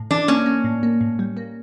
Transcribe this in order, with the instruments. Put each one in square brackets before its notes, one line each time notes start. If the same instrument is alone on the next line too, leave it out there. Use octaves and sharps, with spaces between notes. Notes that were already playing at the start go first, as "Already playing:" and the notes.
Already playing: [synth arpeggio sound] A2
[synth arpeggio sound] E3 [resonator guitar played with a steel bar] D4
[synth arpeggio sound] A#3 [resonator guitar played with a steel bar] C#4
[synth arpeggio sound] A#3
A2
A#3
A2
G3
A#3